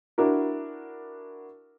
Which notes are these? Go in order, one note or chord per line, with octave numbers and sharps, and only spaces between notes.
D4 E4 F#4 A#4